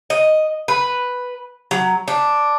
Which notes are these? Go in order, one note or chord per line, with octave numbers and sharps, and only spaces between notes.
D#5
B4
F#3
D4